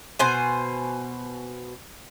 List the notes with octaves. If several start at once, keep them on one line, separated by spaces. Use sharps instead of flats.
B2 C5 G#5